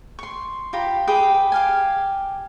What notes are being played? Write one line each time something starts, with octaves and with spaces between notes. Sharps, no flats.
C6 C#6
F4 G4 A#5 B5
G4 G#4 B4 G5
G4 F5 G#5